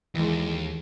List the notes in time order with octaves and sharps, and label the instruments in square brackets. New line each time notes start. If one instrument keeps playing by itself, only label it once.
[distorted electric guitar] D#2 [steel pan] E3 G#3